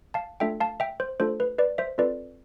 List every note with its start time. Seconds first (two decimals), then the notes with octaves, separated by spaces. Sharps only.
0.14 F5 A5
0.40 A3 D4 F4 A4 E5 G5
0.60 F5 A5
0.80 E5 G5
1.00 C5
1.20 A3 D4 F4 A4 C5
1.40 B4
1.58 B4 D5
1.78 C5 E5
1.98 C4 F4 A4 B4 D5